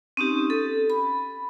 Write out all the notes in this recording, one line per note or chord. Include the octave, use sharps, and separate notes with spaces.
C4 C#4 D#4 G4
A4
B5